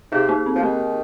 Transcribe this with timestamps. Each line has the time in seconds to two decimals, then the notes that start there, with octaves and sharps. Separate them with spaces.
0.12 C3 D#4 G#4
0.29 A#3 D#4
0.46 C4
0.55 F3
0.63 D#3 A#3